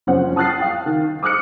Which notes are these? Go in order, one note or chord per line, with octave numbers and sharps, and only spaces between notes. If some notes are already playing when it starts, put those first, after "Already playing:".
F#1 F3 C4 C#4 C5 F#5
A5 D#6 F6 F#6 A6 C7
F5 G5
D#3
D6 D#6 F6 F#6 C#7